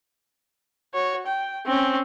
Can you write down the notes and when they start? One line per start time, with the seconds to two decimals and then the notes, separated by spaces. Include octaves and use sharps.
0.94 F#4 C#5
1.27 G5
1.66 C4 C#4